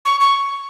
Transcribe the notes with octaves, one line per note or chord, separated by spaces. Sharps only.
C#6
C#6